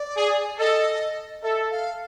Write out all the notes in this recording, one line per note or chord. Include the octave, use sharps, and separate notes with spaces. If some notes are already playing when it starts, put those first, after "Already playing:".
Already playing: D5
G#4
A4 D#5
A4 E5
F5